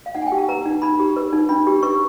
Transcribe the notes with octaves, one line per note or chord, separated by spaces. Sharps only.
F5
D#4 F#5
G#5
G5
G4
A5
B4 A#5
D#4
D#4 B5
G4
B4
D#4
D4 B5
G4
B4 C#6